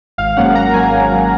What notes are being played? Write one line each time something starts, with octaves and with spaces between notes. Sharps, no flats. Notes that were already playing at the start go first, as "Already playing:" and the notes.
G#1 F5
G#2 F#3 A#3 C#4 F#5
G#1 A#5
G#2 F#3 A#3 C#4 G#5
G#1
G#2 F#3 A#3 C#4